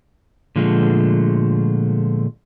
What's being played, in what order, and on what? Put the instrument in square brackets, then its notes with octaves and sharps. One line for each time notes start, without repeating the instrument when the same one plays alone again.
[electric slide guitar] A#2 D3 F3 G#3 A3